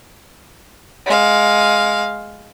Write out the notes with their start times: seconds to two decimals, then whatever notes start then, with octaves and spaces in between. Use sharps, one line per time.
1.06 G#3 F5